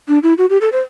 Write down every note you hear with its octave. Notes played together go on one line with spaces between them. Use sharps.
D4
E4
F#4
G4
A4
C5